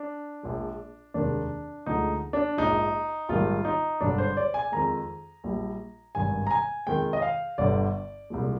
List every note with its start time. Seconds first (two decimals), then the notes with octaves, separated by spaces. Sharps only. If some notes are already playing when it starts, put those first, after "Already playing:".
Already playing: D4
0.43 A#1 A#2 G#3
1.14 F1 D#2 D#3 G#3 D4
1.86 D2 D3 F3 G#3 D#4
2.33 D4
2.57 A#1 G#2 F3 D#4
3.29 A#1 G#2 D#3 G3 F4
3.65 D#4
4.01 G#1 G2 D3 G3 D4
4.18 C5
4.37 D5
4.54 G#5
4.72 F2 D#3 G#3 A#5
5.44 A#1 A#2 G3
6.15 G#1 G2 D#3 G#5
6.47 A#5
6.51 G#5
6.87 F2 D#3 G#3 G5
7.13 D#5
7.22 F5
7.58 G1 G2 D3 D5
8.30 C2 A#2 F3 G#3